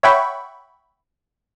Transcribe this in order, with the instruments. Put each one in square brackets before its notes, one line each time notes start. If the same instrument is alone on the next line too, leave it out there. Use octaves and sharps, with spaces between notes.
[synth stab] C#5 E5 F#5 G5 B5 C#6